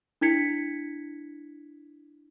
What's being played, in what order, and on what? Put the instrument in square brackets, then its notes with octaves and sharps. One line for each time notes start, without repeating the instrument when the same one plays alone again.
[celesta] D4 E4 G#6 B6 C#7